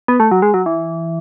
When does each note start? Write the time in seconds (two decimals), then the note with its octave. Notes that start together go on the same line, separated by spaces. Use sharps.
0.08 B3
0.20 A3
0.31 F#3
0.42 G#3
0.54 F#3
0.66 E3